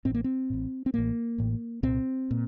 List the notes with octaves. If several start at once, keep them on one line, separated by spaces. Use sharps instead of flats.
A1 A2 C4
A#3
C4
A1 A2
C4
A1 A2 A#3
A1 A2
C2 A#2 C4
A#2